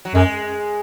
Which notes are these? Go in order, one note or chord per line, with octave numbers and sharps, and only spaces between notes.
F#3
F#2 G#3